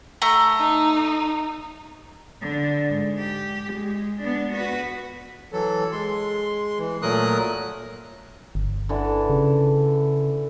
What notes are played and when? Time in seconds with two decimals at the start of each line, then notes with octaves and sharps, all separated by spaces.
0.22 A3 A#5
0.60 D#4
2.41 D3 D4
2.89 G#2
3.19 G4
3.73 G#3
4.22 B3 D4
4.53 F#4 B4
5.53 E3 F#3 A4
5.92 G#3 C6
6.79 E3
7.02 A#2 F#3 A3 A#4 D#6 F#6
8.55 G1
8.89 D3 E3 A4
9.30 C#3